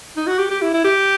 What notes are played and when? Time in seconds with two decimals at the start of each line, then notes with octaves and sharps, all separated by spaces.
0.16 D#4
0.27 F#4
0.39 G4
0.50 G4
0.61 E4
0.74 E4
0.84 G4